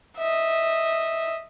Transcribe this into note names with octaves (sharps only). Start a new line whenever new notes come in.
D#5 E5